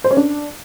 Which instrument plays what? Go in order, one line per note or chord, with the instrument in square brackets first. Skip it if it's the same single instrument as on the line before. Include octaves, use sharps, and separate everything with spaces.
[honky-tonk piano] C5
C#4
D4